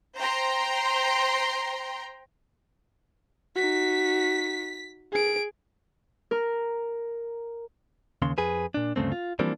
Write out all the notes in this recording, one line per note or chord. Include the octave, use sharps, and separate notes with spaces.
C5 G5 A#5 C6
D#4 F#4 B6
G#4 D7
A#4
D#2 C#3 C6
F2 G#4 B4
A#2 D4
D2 G2 C#3 A3 C4
F4
E3 F3 G3 A#3 C4 D4